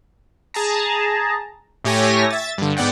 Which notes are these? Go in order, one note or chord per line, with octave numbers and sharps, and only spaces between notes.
G#4 A5 A#5
A2 A3 G4 C#5 G#5 A#6
E5 A6
G2 D3
G#2 B3 D5 F#5 G5